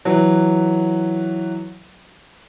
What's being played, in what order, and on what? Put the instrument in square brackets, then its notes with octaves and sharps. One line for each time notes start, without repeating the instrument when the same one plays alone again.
[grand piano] E3 F#3